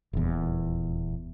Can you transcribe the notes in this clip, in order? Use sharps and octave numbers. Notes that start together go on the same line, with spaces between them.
D#1 E2